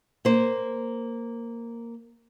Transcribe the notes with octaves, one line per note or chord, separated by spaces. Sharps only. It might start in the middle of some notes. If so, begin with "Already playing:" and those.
A#3 C5